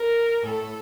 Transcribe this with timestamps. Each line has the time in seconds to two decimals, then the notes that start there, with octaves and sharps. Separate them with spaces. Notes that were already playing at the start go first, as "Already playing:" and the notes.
Already playing: A#4
0.43 A2 A3 A4